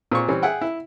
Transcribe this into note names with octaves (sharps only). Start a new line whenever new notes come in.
A#2 C4 G#4 C#6
E3 G3 C4 C#4
G#4 E5 F#5 G5
E4